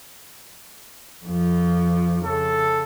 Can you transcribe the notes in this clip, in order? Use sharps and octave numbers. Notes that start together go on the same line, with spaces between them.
F2 F3
C#3 A4